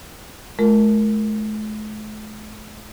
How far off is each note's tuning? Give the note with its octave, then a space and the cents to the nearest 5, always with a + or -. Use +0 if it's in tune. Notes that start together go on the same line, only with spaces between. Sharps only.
A3 -45 F4 +0 A#4 +0